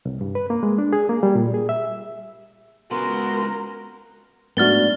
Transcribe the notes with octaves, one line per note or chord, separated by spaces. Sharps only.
C2
G2
B4
A#3
G#3
D4
G#4
A#3
G3
A#2
G#4
E5
C#2 G#3 B3 F#4 A#4 C6
G#2 A3 B3 D4 F#4 F6 A6 G7